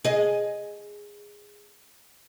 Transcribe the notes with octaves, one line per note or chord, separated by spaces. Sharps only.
G#4 D#5